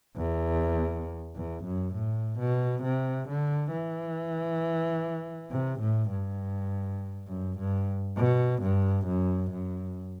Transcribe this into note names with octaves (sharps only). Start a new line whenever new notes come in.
E2
E2
F#2
A2
B2
C3
D3
E3
C3
A2
G2
F#2
G2
B2
G2
F#2
F#2